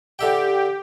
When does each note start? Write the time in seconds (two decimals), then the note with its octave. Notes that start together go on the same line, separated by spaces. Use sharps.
0.19 D3 G4 E5 G5